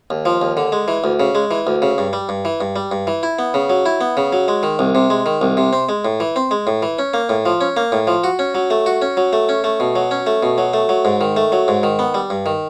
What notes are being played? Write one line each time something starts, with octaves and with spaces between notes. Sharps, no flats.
D#2
F3
D#2
D3
G#3
E3
D2
C#3
G#3
E3
D2
C#3
G2
G3
G2
E3
G2
G3
G2
E3
E4
B3
C#3
F#3
E4
B3
C#3
F#3
G#3
D#3
C2
C3
G#3
D#3
C2
C3
C4
G#3
A2
E3
C4
G#3
A2
E3
C#4
A#3
A2
F3
C#4
A#3
A2
F3
F#4
C#4
F#3
A3
F#4
C#4
F#3
A3
C#4
A3
B2
F#3
C#4
A3
B2
F#3
A3
F#3
G#2
D#3
A3
F#3
G#2
D#3
B3
G3
G2
D#3